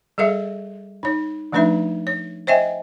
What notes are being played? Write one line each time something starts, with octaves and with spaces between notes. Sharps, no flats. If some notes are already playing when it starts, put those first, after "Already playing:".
G3 G#4 A4 E5 F5
D#4 C#5
F3 A3 D4 D#4 B4 E5
C#5
C5 C#5 D#5 E5 G5 G#5